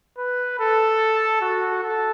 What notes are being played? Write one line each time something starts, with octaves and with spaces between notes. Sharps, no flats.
B4
A4
F#4
A4